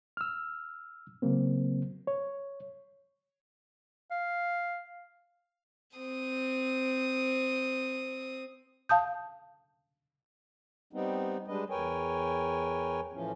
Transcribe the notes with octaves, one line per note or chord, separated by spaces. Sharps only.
E6 F6
C#3 F#3 A#3 C4
C#5
F5
C4 D#6
F5 A5 D#6 G6
G3 B3 C4 D#4
G3 G#3 D4 B4 D#5
E2 A#4 B4 C#5 G5 G#5
A2 E3 F3 C#4